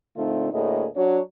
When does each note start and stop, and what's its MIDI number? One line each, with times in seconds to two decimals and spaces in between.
0.17 0.49 46
0.17 0.49 50
0.17 0.49 57
0.17 0.49 60
0.17 0.49 63
0.17 0.49 65
0.53 0.87 38
0.53 0.87 45
0.53 0.87 57
0.53 0.87 58
0.53 0.87 68
0.53 0.87 75
0.97 1.19 54
0.97 1.19 62
0.97 1.19 66
0.97 1.19 73